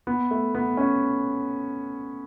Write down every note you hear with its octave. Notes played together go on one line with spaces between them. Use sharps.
B3
A3
B3
C#4